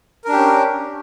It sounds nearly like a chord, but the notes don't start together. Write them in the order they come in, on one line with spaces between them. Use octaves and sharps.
A#4 D4 G4 C#4